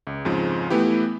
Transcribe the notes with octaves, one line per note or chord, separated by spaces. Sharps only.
C#2
F2 G#2 C#3 F3
E3 A3 B3 E4 G4